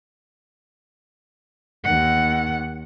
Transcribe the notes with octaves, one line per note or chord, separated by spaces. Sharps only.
D#2 F#5